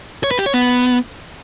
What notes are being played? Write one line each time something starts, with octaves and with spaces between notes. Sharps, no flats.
C#5
B4
G4
C#5
B3